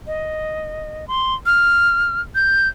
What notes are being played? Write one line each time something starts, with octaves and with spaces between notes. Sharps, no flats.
D#5
C6
F6
G6